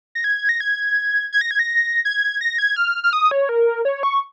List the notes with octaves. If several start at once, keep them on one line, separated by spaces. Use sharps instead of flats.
A#6
G#6
A#6
G#6
G#6
A#6
G#6
A#6
G#6
A#6
G#6
F6
F6
D#6
C#5
A#4
C#5
C#6